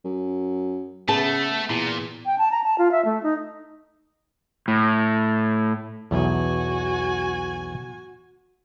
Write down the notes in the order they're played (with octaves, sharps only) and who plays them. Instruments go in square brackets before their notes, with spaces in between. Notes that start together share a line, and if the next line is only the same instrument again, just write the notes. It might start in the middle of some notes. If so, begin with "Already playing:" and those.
[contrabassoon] F#2
[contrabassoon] C#3 [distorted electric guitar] A3 [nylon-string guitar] B3 A5
[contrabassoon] E2 [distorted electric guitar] A#2
[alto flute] G5
A5
A#5
A5
F4
E5
A3
D#4
[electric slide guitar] A2
[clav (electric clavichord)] B1 E2 [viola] F#4 G#5